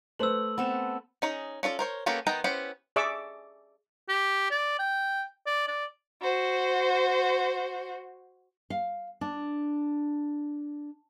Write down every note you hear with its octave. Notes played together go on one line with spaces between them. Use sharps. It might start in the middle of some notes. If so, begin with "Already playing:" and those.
A3 B4 C5 E6 F#7
B3 C4 A4
C#4 D#4 G#4
C#4 F4 A4 D5
A#4 C5 C#5
A#3 B3 C#4 G4 A4
D#3 B3 D#5 G5 A#5
B3 C#4 E4 G4 C5
G#4 D5 E5 C#6 D6 E6
G4
D5
G5
D5
D5
F#4 C5
F5
D4